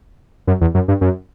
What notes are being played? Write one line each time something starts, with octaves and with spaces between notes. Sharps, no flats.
F#2
E2
F#2
G2
F#2